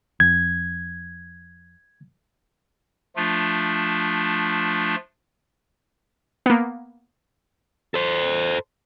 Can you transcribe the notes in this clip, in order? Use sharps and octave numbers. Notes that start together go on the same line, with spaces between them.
F2 G#6
F3 A3 D4 F4
A#3 B3
A4 C5